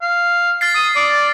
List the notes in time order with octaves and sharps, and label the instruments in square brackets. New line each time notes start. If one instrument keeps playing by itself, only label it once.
[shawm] F5
[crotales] F6 A6 C7
[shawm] D#6
D5